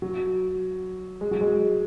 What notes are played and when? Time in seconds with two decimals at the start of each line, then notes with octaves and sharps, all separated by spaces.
0.02 F#3
1.21 G#3
1.31 F#3
1.41 G#3